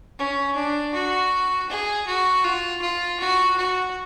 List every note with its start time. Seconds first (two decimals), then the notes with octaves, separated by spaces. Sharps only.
0.19 C#4
0.56 D4
0.94 F#4
1.69 G#4
2.07 F#4
2.44 F4
2.81 F4
3.19 F#4
3.57 F#4